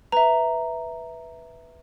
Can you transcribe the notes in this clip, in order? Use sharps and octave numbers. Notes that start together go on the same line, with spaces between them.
B4 E5 A#5